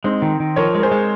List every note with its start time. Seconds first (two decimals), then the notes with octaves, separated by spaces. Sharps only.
0.04 G#3 C4 D#4
0.22 D#3
0.40 D#3
0.56 F3 A#4 C#5
0.75 G#3 A#4
0.83 G#4 C5
0.91 G#3